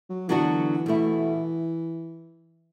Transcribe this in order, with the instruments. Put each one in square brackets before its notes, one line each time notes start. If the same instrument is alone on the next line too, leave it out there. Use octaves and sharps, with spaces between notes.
[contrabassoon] F#3
[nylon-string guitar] D3 F#3 B3 D4 F#4 [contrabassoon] E3
[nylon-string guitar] B2 A3 E4